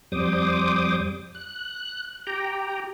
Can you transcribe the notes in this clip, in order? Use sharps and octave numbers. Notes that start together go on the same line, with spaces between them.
F2 G3 C5 D6 D#6
F#6
G4 G5 A#5